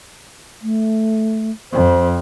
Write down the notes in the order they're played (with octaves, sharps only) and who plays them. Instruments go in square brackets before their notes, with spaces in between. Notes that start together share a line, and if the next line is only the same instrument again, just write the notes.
[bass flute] A3
[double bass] F2 [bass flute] C5